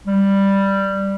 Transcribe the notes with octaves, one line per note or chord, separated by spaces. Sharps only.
G3